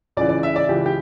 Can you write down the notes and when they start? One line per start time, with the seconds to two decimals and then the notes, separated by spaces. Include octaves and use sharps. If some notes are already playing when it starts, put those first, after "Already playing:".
0.17 C#2 C#3 E3 D5
0.29 D5
0.43 E5
0.56 D5
0.69 C#2 C#3 E3 G4
0.86 G4